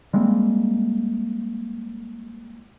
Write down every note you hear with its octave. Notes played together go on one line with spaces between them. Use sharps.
G3 G#3 A#3 C4